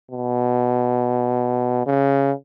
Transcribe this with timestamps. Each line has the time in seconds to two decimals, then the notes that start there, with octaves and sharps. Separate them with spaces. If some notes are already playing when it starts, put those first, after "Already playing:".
0.11 B2
1.86 C#3